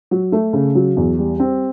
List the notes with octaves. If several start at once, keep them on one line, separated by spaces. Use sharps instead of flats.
F#3
A3
C#3
F#3
E2
G3
C4